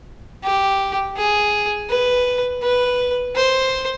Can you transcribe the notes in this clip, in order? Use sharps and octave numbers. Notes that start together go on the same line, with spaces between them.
G4
G#4
B4
B4
C5